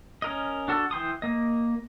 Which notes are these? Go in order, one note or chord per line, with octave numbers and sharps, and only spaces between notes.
C#4 A#4 D#5
D4 F#4 A4
E3 G5 C6 D#6
A#3 D#5